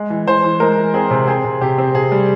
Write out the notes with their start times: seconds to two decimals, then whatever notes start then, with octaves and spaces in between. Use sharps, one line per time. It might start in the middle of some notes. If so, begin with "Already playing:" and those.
Already playing: G#3
0.10 E3
0.27 E3 C5
0.44 E3
0.60 G#3 A#4
0.77 E3
0.94 C4 G#4
1.11 C3
1.27 C4 G#4
1.45 C3
1.61 C3 G4
1.78 C4
1.94 C3 G#4
2.12 G3